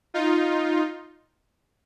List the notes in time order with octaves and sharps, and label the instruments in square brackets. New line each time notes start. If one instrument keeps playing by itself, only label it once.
[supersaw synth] D#4 F4